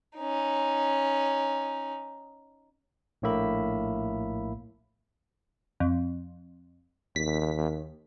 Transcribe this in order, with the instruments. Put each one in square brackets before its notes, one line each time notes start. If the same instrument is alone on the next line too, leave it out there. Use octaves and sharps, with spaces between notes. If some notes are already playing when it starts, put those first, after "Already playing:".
[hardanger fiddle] C#4 D#4
[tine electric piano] A#1 A2 A#3 E5 B5
[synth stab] F2
[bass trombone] D#2 [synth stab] B6